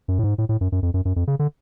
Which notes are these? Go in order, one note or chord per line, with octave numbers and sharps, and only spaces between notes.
F#2
A2
G#2
A2
A2
F#2
F#2
F2
F#2
F#2
F2
C#3
D3